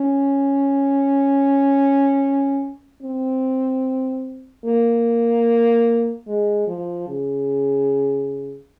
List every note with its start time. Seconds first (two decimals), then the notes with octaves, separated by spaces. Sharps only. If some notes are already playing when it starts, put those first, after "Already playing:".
Already playing: C#4
3.03 C4
4.65 A#3
6.27 G#3
6.67 F3
7.08 C#3